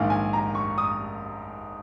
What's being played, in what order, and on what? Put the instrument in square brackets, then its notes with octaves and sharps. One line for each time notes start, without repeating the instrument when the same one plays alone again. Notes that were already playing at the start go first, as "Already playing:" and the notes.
Already playing: [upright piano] A#1 G#2 D#3 F5
G#5
A#5
C#6
D#6